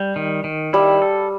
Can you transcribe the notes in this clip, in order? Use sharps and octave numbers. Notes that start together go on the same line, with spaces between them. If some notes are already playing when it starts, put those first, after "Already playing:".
Already playing: G3
D#3
D#3
G3 E4
A4